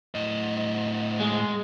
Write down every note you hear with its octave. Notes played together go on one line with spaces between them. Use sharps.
A2 D#5
G#3